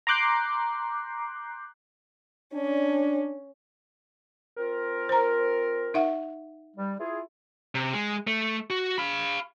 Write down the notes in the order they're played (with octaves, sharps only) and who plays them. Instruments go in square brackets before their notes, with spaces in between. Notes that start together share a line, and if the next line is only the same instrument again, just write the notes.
[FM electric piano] A#5 C6 D6 F#6 G6 C7
[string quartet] C#4 [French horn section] D4
[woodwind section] C4 F4 A#4
[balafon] C5 A#5
D#4 E5 F#5
[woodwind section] G3
E4 F4 G#4
[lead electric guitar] C3
G#3
A3
F#4
F5 B5